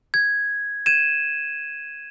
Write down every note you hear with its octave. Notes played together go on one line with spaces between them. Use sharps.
G#6
G#6 D#7 E7